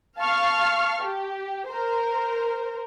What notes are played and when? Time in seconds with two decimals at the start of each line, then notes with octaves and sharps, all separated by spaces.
0.18 F5 A5 C#6 F6 C7
1.01 G4
1.67 A#4 C5